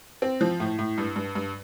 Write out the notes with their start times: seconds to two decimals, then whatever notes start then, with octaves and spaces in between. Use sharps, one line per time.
0.22 C4
0.41 F3
0.60 A2
0.79 A2
0.98 G2
1.16 G2
1.35 G2